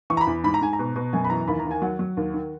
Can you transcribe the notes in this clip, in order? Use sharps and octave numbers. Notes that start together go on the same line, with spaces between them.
E3 C#6
A#5
B5
E2
G#2 B5
A#5
G#2 G#5
A#5
B2
B2
F#2 G#5
B5
E3 A#5
D#2 B5
A#5
D#3
G#5
F#3 F#5
F#3
D#2
D#3